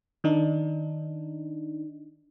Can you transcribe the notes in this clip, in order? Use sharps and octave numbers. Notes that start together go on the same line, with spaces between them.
D#3 D4 D#4